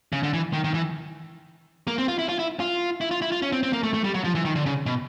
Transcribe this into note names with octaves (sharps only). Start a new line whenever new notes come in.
C#3
D3
E3
D#3
D#3
E3
A#3
C4
F4
E4
F4
E4
F4
E4
F4
E4
F4
C#4
C4
C4
A#3
A3
A3
G3
F#3
F3
E3
D#3
D3
C#3
B2